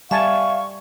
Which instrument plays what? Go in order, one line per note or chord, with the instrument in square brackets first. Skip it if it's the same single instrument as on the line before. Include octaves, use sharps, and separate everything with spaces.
[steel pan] G3 G#5 A5 [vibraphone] E5 [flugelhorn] F5 [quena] C#6